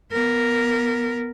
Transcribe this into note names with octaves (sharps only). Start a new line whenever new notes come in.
B3 A#4